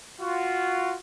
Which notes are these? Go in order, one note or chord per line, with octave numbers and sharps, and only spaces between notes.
F4 F#4